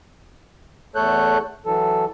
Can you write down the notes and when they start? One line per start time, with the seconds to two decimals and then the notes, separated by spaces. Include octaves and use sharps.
0.96 E2 A3 A4 C#5 F#6 G6
1.66 E3 F#3 A4